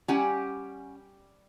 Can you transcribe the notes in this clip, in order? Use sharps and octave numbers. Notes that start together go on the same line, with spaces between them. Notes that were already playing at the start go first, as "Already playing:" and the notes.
G3 C#4 G4 F#5 G#5